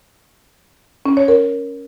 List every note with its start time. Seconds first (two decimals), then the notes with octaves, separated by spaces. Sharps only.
1.06 C#4
1.17 C#5
1.28 A#4